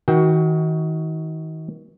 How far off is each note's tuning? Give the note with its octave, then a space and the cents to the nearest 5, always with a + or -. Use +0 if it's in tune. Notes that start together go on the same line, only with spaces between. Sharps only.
D#3 +35 F#4 +10 G5 +0